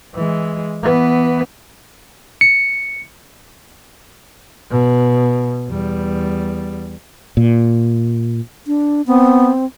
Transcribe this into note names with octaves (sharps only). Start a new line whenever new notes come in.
E3 G#3
E3 B3
C#7
B2
E2 G3
A#2
D4
B3 C4